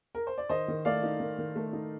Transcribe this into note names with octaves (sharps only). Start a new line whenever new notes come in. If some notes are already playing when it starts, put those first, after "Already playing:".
A#4
C5
D5
D#3 C5 D#5
D#3
A3 D5 F5
D#4
D#3
D#3
A3
D#4